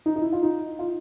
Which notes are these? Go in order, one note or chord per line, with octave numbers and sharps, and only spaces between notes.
D#4
D#4
E4
F4
D#4
F4